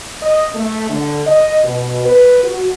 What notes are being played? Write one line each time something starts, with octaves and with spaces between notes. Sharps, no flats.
D#5
A3
D3
D#5
B2
B4
F#4